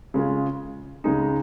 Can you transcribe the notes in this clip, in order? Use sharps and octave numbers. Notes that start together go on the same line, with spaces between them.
C#3 G#3 F4
C#2 C#3 G#3 D#4